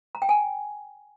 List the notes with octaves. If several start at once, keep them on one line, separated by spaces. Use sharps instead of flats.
A#5
G5
G#5